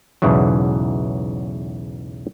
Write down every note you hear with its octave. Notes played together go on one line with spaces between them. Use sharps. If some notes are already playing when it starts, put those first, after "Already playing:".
B1 E2 G#2 C#3 E3 F#3